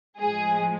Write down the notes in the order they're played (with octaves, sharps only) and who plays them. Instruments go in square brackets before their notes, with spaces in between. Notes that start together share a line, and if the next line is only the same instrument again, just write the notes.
[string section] A2 F3 G#3 G#4